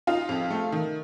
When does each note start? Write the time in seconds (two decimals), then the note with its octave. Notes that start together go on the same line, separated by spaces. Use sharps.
0.07 D#4 F4 F5
0.29 F2
0.51 A3
0.72 D#3